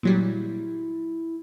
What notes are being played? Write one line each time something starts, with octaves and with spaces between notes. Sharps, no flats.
A#2 F#3 G3 E4